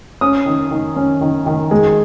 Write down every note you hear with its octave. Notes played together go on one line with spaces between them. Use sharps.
C#4 D#6
D#3
D#3
C#4
D#3
D#3
G#3